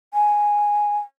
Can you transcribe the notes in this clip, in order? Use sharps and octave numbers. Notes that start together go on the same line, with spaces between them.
G#5